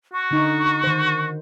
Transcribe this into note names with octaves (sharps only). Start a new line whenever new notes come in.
F#4 C#6
D3 D#4
D#3 C5